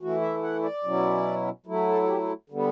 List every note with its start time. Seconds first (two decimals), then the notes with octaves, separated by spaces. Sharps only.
0.01 E3 A3 E4 F#4
0.21 E5
0.43 F#5
0.63 D5
0.84 B2 F#3 C#4 E4
1.66 F#3 A3 E4
1.87 A4
2.02 A4
2.08 G4
2.22 A4
2.50 D3 G3 B3